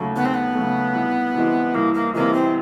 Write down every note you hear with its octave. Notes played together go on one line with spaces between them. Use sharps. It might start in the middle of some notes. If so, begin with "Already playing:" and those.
Already playing: D#2 C#3 F#3 A3
D#2 B3
C4
B3
C#3 F#3 A3
C2
C3 E3 G#3
C2 A#3
A#3
C3 E3 G#3 A#3
C4